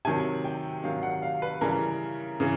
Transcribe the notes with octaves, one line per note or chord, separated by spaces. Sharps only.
C3 D#3 F#3 G#5
G5
C3 D#3 F#3 F5
F#5
F5
B4
C#3 E3 G3 A#4
C#3 E3